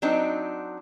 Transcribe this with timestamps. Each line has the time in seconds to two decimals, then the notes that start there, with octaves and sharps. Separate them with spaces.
0.02 F#3 C4 D4 D#4